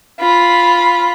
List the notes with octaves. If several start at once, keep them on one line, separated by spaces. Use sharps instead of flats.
F4 B5